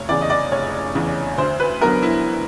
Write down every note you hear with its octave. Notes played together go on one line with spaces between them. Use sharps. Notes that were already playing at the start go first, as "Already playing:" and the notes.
Already playing: F1 C#5
E2 C#3 D5
D#5
D5
F1 C#5
E2 C#3
D2 C5
B4
D3 F#3 B3 A#4
E4